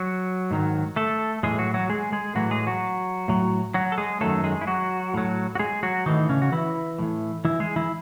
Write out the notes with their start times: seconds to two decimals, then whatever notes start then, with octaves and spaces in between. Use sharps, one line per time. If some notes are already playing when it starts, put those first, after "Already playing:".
Already playing: F#3 F#4
0.51 G#2 D#3 F#3
0.96 A3 A4
1.43 A2 E3 G#3 G#4
1.58 F#3 F#4
1.74 F#3 F#4
1.89 G#3 G#4
2.12 G#3 G#4
2.35 A2 E3 F#3 F#4
2.51 G#3 G#4
2.67 F#3 F#4
3.28 A2 F#3
3.74 F#3 F#4
3.92 A4
3.98 G#3 G#4
4.21 F#2 D#3 F#3 A3 A4
4.44 G#3 G#4
4.61 E4
4.67 F#3 F#4
5.14 A2 F#3
5.55 F#4
5.59 G#3 G#4
5.83 F#3 F#4
6.06 A2 D#3 E3 D#4
6.29 C#3 C#4
6.42 F#4
6.52 E3 E4
6.99 A2 E3
7.45 E3 E4
7.60 G#3 G#4
7.76 E3 E4